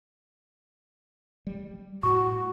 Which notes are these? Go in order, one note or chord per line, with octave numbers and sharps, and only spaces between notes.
G3
A2 F#4 C#6